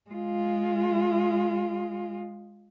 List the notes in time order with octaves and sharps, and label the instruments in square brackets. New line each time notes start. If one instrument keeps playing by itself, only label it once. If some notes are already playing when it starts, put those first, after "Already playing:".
[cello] G#3 F4